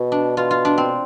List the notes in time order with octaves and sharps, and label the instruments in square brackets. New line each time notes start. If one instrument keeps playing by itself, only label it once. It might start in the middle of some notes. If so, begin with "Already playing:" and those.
Already playing: [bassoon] B2
[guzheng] D4
[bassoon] B2 [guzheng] F4
[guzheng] F4
D4
C4